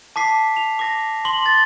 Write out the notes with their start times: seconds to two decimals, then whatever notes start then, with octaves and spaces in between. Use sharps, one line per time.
0.16 A5 D6 B6 C7
0.57 F7
0.79 D6 A#6
1.25 C6 D6 F#7 G7
1.46 A6